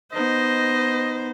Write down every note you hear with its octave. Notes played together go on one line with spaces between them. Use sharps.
B3 D#4 C5 D#5